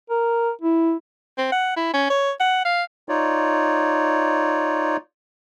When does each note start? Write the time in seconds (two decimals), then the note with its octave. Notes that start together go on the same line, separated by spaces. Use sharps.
0.10 A#4
0.61 E4
1.38 C4
1.52 F#5
1.77 E4
1.94 C#4
2.10 C#5
2.40 F#5
2.65 F5
3.09 D#4 F4 C#5 D5